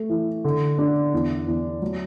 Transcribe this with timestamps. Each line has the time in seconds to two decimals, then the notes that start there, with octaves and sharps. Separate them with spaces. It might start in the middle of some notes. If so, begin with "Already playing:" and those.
Already playing: A3
0.09 E3
0.44 D3
0.78 D4
1.13 E2
1.47 E2
1.82 F#3